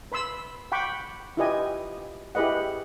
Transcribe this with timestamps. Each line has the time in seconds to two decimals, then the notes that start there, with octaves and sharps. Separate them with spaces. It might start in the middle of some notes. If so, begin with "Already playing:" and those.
0.12 B4 B5 C6 E6
0.72 F#5 G5 B5 C#6 D6
1.37 E4 F4 G4 B4 D#5 G#5
2.35 E4 G4 G#4 B4 D#5 F#5